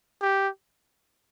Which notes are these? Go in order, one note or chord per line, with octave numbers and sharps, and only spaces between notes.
G4